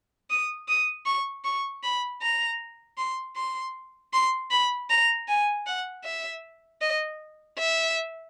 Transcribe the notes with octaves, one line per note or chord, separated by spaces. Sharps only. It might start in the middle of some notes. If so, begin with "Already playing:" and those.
D#6
D#6
C#6
C#6
B5
A#5
C6
C6
C6
B5
A#5
G#5
F#5
E5
D#5
E5